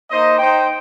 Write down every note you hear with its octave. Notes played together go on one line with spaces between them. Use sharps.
A#3 D#4 C5 D#5
D#4 C5 G5